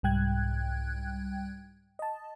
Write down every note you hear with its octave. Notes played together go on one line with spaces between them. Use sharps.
C2 G#2 G3 G5 F#6 G#6
D#5 A5